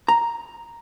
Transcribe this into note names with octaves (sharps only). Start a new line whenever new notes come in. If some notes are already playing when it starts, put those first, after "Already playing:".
A#5